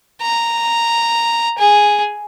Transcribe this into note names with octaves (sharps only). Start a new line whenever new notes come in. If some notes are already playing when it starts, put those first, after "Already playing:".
A#5
G#4